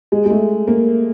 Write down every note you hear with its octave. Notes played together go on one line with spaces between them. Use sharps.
G#3
G#3
A3
A#3